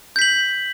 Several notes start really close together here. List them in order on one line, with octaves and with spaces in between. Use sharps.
G6 B6 F#7